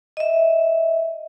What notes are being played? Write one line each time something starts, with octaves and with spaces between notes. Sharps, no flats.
D#5 E5